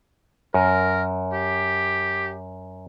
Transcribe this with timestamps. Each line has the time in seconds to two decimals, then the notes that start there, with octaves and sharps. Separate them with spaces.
0.54 F#2 A#4
1.33 G4